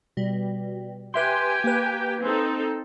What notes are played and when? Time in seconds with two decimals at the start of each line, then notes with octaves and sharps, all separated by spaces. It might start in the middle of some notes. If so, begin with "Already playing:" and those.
0.17 B2 G3
1.14 G4 B4 E5 G5 G#5 C6
1.64 A#3 B4
2.22 C4 D#4 A4